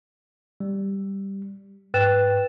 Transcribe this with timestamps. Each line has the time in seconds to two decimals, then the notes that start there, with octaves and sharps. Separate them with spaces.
0.60 G3
1.94 G#2 B4 G5 F#6 A6 E7